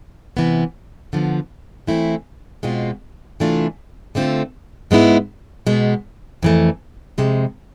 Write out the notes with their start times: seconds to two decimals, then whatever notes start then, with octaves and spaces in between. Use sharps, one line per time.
0.37 C3 E3 B3
1.13 D3 F3 B3
1.87 E3 A3 C4 E4
2.63 B2 G#3 C4 F4
3.40 C3 E3 A3 D4 F4
4.15 D3 A3 C4 F4
4.91 G#2 G#3 B3 E4
5.67 B2 G#3 B3
6.43 F2 E3 A3
7.18 F2 C3 G#3